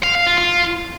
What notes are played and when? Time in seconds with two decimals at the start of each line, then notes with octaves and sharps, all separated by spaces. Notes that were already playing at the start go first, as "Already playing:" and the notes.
0.03 F5
0.15 F5
0.27 F4
0.38 F4